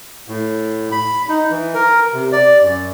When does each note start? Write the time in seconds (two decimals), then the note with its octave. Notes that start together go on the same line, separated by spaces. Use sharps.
0.28 A2
0.92 B5
1.29 D#4
1.51 E3
1.75 A#4
2.14 C3
2.32 D5
2.62 F#2